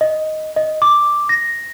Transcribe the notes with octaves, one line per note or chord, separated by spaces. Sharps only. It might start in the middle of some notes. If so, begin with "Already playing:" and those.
D#5
D#5
D6
A#6